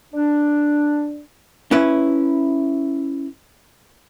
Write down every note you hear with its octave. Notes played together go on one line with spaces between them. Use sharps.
D4
C#4 E4 B4